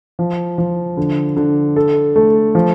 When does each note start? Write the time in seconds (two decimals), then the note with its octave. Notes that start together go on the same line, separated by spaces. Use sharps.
0.19 F3
0.58 F3
0.97 D3
1.37 D3
1.76 A4
2.16 A3
2.55 F3